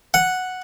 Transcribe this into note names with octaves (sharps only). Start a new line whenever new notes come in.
F#5